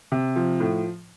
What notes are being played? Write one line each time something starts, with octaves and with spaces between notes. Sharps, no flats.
C3
F3
A2